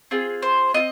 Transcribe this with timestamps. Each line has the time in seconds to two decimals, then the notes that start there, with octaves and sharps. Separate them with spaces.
0.11 C4 F4 G#4
0.42 C5
0.74 C4 F4 D#5